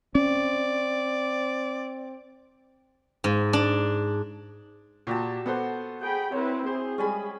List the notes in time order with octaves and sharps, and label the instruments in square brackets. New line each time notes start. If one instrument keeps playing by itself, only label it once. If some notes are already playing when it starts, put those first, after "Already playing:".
[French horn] C4 [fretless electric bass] C#4 [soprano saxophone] D5
[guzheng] G#2
D4
[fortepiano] A#2 [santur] F#4 G4 A5
[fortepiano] B3 A4 C5 [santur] F#5
[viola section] G#4 G5 B5
[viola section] C4 E4 B4 [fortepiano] C#5
[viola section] G#4 [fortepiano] C5
[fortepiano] G3 G#3 [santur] C#4 G#5 B5